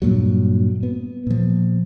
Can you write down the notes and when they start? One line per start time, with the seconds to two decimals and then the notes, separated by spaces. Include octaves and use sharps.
0.02 G2 A#2 F#3
0.83 B3
1.27 A#2 F3